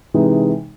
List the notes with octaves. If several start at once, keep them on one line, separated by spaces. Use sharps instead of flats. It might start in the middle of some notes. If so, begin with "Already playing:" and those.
C3 E3 G#3 D#4